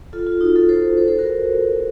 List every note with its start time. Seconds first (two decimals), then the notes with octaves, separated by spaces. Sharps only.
0.13 F4 A4
0.27 F4
0.41 D#4 F#4
0.56 F4 A4
0.69 A4 C5
0.97 A4 C5
1.08 A4 C5
1.18 F#4 A#4